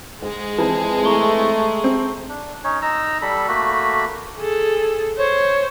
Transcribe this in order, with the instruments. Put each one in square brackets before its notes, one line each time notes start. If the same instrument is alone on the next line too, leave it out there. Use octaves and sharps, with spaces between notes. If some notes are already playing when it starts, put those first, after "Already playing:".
[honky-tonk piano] G#2 [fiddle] G#3 G#4
[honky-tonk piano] F2 E3 [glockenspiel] A5
[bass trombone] A3 [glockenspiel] A#5 C#6 G7
[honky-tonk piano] C4
[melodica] D4
C#4 D#4 C#5
D#4 A#5 E6
G3 A4 B5
A3 A#3 F#4 B5
[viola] G#4 A4
[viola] C5 [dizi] C#5